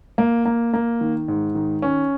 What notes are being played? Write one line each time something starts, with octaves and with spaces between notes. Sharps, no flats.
A#3
A#3
A#3
D#3
G#2
D#3
C#4